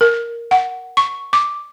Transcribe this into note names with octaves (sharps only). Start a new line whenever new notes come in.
A#4
F#5
C#6
D6